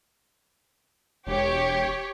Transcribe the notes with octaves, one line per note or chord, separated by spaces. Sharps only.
E1 G4 C#5